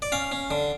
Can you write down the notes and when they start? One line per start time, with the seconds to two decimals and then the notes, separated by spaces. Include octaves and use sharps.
0.02 D5
0.12 C#4 F5
0.32 C#4
0.51 D3